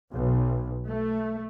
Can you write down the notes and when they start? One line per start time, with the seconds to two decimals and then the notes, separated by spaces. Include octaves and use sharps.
0.13 B1
0.87 A3